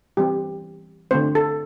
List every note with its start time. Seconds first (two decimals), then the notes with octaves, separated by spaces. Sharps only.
0.17 E3 G3 C4 G4
1.11 D3 A3 C4 C5
1.35 A4